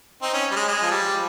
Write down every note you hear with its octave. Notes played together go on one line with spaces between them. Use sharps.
C4 D#4
C#4
G3
G#3
G#3
F3
G3
F3